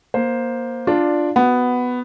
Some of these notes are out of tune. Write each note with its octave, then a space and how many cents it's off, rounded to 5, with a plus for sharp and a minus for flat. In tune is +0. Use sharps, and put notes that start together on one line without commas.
A#3 +15 C5 +0
D4 +5 F4 +0 D5 +0
B3 +5 F#4 +0